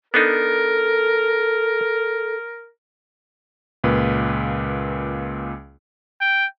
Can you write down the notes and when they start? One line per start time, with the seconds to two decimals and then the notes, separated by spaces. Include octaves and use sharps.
0.14 B3 D4 D#4 A4 A#4
3.84 C#2 A#2 B4
6.21 G5